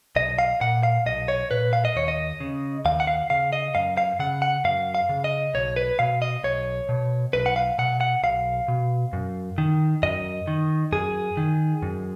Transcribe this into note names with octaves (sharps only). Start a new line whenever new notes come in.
B1 D#5
F5
A#2 F#5
F5
B1 D#5
C#5
A#2 B4
F5
D#5
D#2 C#5
D#5
C#3
D#2 F5
F#5
F5
C#3 F5
D#5
F#2 F5
F5
C#3 F#5
F#5
F#2 F5
F5
C#3
D#5
B1 C#5
B4
B2 F5
D#5
B1 C#5
B2
B1 B4
F#5
F5
B2 F#5
F#5
B1 F5
B2
F#2
D#3
F#2 D#5
D#3
F#2 G#4
D#3
F#2